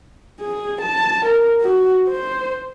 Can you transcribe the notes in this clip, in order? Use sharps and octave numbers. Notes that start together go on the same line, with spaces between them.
G#4
A5
A#4
F#4
C5